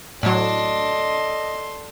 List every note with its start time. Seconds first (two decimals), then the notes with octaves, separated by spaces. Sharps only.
0.23 A2 F#3 A4 D5 D#5 A5 C6